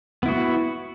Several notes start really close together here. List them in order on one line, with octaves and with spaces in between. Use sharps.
B3 E4 F#4